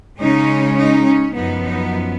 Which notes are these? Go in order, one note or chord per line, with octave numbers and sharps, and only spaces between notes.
C#3 G#3 C#4 D#4
D#4
C#4
F#2 F3 B3 D#4
D#4